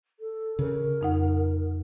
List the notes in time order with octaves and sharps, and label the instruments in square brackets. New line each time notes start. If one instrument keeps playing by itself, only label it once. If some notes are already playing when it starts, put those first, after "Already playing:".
[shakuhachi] A4
[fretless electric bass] C#3 [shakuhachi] A#4
[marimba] F2 D#4 F#5